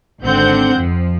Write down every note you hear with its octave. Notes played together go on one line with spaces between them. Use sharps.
G#1 D3 C4 F#5 G6
F2 F3